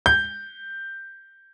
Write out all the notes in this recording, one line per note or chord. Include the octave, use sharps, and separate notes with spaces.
G6